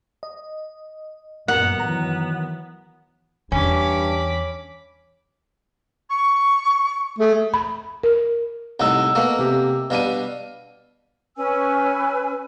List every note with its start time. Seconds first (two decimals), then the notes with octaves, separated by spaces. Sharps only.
0.23 D#5
1.48 G1 F#2 A#2 B3 A#4 F#5 A#5
1.80 D#3 E3 F#3 A#5
3.52 E2 G2 C#4 D4 B5 D6
6.09 C#6
7.18 A3 G#4
7.54 B5
8.04 A#4
8.80 C2 A2 D#4 F#5 E6
9.15 B2 A3 A#3
9.39 C3 G4
9.90 B2 G3 D4 F5 D#7
11.37 C#4 B4 G#5 E6